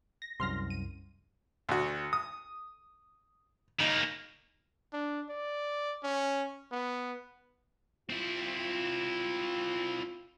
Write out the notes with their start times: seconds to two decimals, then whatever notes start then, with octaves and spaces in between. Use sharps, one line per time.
0.22 A#6
0.40 C2 F#2 C6 F6 A#6
0.70 D#7
1.69 D2 F#4
2.13 D#6
3.80 C#3 A#3 D#4
4.93 D4
5.29 D5
6.03 C#4
6.72 B3
8.10 C4 E4 F4